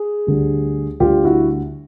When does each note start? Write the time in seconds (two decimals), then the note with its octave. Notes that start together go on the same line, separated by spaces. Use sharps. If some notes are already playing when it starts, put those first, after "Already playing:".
Already playing: G#4
0.27 D2 D3 G3
1.00 D2 D3 G3 F4 G4
1.24 E4 F#4